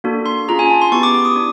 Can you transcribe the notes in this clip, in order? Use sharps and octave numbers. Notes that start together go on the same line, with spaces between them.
A#3 D4 F#4 A4
C6
C#4 F4 G#4 A#5
G#5
A5
C6
B3 E4 G4 C#6
D6
D6
D#6
D4